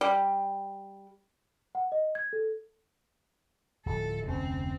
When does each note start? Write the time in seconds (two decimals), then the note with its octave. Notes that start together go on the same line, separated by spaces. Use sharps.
0.01 G3
1.75 F#5
1.92 D#5
2.15 G#6
2.33 A4
3.86 D1 F3 A4
4.26 F1 D2 C4 C#4